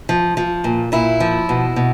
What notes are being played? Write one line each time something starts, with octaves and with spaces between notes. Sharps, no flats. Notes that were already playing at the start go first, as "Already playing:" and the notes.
F3
F3
A#2
A#2 E4
F3
B2
B2